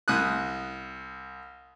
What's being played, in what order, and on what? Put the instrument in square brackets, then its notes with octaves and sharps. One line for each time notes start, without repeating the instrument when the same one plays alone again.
[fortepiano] C2 D#6 F#6